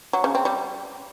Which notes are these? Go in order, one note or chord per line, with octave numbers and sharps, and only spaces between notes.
F#3
C#3
C4
G3